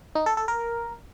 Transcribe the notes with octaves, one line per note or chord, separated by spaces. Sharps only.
D#4
A4
A4
A#4